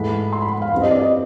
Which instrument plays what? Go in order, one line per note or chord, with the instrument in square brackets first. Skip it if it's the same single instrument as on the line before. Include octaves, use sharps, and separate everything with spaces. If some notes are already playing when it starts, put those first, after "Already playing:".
Already playing: [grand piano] G#2 E3 A3 [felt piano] B5
[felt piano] C6
B5
F#5
F5
[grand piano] G2 E3 G3 C4
[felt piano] D#5
D5
D#5